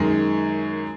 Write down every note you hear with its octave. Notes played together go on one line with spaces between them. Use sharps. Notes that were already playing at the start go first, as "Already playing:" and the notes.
Already playing: F#2 D#3 G#3